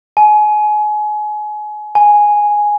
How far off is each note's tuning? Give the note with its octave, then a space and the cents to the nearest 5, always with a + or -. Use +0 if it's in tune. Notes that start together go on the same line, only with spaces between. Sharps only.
G#5 +30
G#5 +0